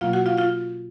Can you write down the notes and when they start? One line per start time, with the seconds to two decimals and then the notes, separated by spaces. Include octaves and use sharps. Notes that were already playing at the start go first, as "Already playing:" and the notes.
0.01 B2 F#3 A#3 F4 F5
0.13 F#4 F#5
0.26 F4 F5
0.38 F4 F5